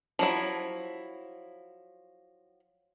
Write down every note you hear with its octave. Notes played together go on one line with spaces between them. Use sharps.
F3 F#3 E4